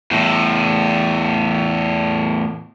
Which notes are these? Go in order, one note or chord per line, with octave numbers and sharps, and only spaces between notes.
E2 A2